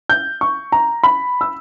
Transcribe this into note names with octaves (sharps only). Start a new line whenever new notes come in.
G6
C#6
A#5
B5
E6